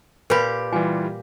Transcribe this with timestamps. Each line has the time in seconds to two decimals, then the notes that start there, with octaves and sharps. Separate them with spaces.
0.30 A#2 G4 A#4 B4 B5
0.73 E3 G3 F4 G#5